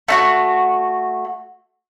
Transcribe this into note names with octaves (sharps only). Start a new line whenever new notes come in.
A3 D#4 F#4